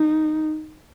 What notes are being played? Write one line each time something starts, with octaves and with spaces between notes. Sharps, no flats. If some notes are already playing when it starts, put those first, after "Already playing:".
Already playing: D#4